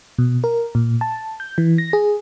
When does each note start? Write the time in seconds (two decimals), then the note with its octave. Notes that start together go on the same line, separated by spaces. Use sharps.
0.18 B2
0.44 A#4
0.75 A#2
1.01 A5
1.40 G6
1.58 E3
1.78 A#6
1.93 G#4